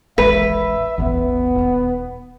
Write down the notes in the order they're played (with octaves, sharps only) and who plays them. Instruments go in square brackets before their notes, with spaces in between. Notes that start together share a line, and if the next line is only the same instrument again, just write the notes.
[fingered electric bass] D#1 A1 G#3 [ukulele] B4 [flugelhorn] E5
[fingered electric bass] D1 A1 E2 [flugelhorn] B3
[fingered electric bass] D#1